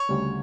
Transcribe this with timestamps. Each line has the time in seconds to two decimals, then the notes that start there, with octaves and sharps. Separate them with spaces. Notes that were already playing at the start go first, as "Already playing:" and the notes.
Already playing: C#5
0.09 D2 C#3 G3